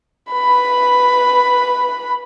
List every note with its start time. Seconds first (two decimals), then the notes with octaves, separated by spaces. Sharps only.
0.33 B4 B5